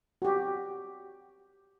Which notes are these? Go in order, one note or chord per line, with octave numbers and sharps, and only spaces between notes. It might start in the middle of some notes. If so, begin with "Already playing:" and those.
F#4 G4